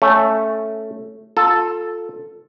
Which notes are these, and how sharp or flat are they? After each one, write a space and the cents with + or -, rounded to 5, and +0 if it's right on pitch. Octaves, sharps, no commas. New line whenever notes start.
A3 +0 C#4 +0
F4 +20 A4 +0